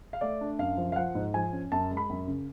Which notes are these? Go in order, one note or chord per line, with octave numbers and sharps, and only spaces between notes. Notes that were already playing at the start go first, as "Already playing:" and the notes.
F5
A3 D5
D4
F#2 F5
F3
F5
F3 F#5
G#2
F3 G#5
C#4
F#2 A5
G#3
B5
F#2
C#3